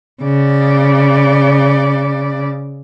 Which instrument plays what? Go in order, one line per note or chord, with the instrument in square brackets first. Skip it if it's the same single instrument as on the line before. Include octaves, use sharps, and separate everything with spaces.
[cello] C#3 D5